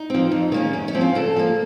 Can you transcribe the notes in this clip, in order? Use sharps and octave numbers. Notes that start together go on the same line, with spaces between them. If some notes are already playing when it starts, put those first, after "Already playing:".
Already playing: D#4
F3 C4
F2
D#3 A#3 C#4
F#2 C#4
C#4
F3 C4
F4
C#3 A4
F3 A#3